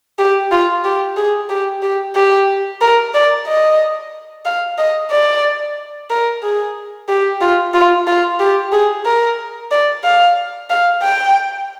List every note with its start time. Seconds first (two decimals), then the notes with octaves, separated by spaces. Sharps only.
0.18 G4
0.51 F4
0.84 G4
1.17 G#4
1.49 G4
1.83 G4
2.15 G4
2.81 A#4
3.14 D5
3.47 D#5
4.45 F5
4.78 D#5
5.11 D5
6.10 A#4
6.43 G#4
7.08 G4
7.41 F4
7.74 F4
8.07 F4
8.40 G4
8.72 G#4
9.05 A#4
9.71 D5
10.04 F5
10.70 F5
11.02 G5